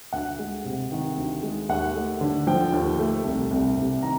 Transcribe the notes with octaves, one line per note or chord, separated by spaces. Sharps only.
D2 F#5
G#3
C3
D#3
D2
G#3
D#2 F#5
A3
D3
F3 G5
D#2
A3
C2
C2
C3
D#3 A#5